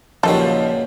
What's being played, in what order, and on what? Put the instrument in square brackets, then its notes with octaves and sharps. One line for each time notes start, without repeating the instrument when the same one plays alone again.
[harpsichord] C#2 A#2 F#3 [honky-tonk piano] F3 D#4 G4 [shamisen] A4